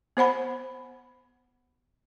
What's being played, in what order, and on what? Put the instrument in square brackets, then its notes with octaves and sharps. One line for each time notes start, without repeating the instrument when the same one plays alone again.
[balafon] B3 C5 F#5 B5